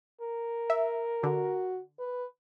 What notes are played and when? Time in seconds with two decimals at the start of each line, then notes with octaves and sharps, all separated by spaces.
0.21 A#4
0.70 E5
1.23 D3 F#4
1.99 B4